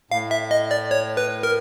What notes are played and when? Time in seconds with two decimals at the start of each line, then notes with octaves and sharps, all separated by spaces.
0.11 A2 F5
0.31 E5
0.51 D#5
0.71 D5
0.91 C#5
1.17 B4
1.43 A#4